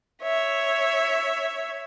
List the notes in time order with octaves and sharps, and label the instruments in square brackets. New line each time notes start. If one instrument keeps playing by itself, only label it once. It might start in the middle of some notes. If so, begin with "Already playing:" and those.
[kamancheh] C#5 E5